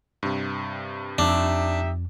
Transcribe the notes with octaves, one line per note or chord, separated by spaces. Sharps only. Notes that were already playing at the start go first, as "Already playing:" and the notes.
G2 C3
F2 D4 D#4 G4 E5